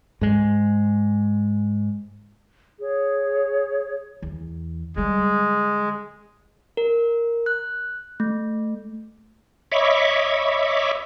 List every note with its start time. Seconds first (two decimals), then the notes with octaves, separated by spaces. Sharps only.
0.21 G#2 G#3
2.79 G#4 C#5
4.22 E2
4.96 D3 G3 G#3
6.77 A#4
7.46 F#6
8.20 A3
9.72 C#5 D#5 E5 B5 C#6 D6